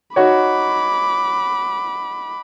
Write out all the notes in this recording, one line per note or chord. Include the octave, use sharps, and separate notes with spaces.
D#4 F#4 C#5 B5 D6